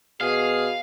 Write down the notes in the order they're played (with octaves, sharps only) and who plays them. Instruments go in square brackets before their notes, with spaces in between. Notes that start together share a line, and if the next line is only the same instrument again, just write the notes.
[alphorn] B2 [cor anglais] G#4 [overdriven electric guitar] F5